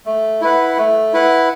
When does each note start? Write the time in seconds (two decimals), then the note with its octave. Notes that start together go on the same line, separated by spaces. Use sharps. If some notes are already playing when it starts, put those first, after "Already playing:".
0.06 A3
0.41 E4 B4 F#5
0.77 A3
1.14 E4 B4 F#5